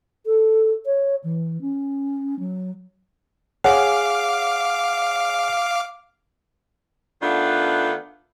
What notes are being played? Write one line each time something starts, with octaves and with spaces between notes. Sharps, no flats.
A4
C#5
E3
C#4
F#3
G#4 C#5 F5 F#5 D6
D#3 A3 B3 D4 F4